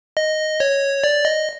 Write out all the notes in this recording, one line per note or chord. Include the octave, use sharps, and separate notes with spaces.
D#5
C#5
D5
D#5